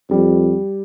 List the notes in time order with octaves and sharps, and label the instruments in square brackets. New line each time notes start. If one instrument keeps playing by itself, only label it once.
[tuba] F2 [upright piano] G3